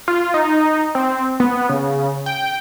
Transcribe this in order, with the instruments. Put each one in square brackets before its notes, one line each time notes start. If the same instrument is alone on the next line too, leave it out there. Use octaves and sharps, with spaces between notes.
[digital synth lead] F4
D#4
C4
B3
C#3
G5